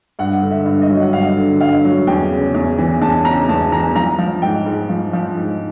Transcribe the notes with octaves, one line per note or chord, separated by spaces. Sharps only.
G2 F#5
D3
E5
G2
D#5
F#3
F#5
G2 F5
D3
G2 F5
F#3
E2 G5
C#3
E2
E3
E2 A5
C#3 A#5
E2 A5
E3 A#5
F3 A#5
F3
G#2 G5
G#2
F3
F3
G#2